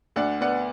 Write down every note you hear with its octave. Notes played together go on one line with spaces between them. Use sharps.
D2 D5 F#5
B3 D5 F#5